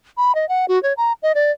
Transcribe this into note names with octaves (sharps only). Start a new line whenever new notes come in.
B5
D#5
F#5
F#4
C#5
A#5
D#5
D5